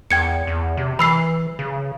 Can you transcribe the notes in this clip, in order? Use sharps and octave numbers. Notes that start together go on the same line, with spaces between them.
E2 G5 G#6 C#7
E2
C3
E3 B5 E6 C7
C#3